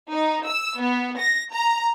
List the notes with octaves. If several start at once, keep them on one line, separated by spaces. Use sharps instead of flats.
D#4
E6
B3
A#6
A#5